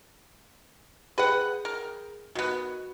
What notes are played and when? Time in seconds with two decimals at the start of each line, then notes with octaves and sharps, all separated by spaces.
1.18 G#4 B4 F#5 G5
1.65 A#4
2.35 D#3 B3 F#4 F#6